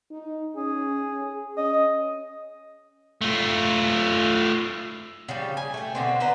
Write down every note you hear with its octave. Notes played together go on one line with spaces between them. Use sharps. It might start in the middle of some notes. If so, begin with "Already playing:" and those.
D#4
C#4 G#4
G#4
C#4 D#5
A3 F4
C#3 F3 G3
G#5
A3 G5
B2 D3 C4
D3 B4 C5 A#5